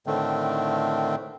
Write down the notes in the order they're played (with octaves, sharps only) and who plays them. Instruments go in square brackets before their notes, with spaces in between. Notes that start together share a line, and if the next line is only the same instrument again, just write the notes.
[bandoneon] A2 D3 D#3 A3 C4